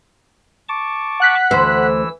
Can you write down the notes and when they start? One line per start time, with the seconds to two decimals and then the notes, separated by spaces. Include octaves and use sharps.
0.69 A5 C#6 D6
1.20 F#5 F#6 B6
1.51 D2 E3 C5 E6